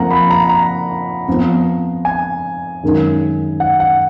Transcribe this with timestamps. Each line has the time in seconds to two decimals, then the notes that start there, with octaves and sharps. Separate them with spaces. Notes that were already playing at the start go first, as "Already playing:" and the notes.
Already playing: F2 F3 A#3 F4 A#4 F#5 A#5
0.11 B5
0.30 A#5
0.49 A#5
1.28 F2 F3 B3
2.05 G#5
2.83 F#2 D#3 G#3 D#4 A#4
3.60 F#5
3.80 F#5